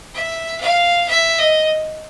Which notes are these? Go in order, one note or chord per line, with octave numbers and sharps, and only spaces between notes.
E5
F5
E5
D#5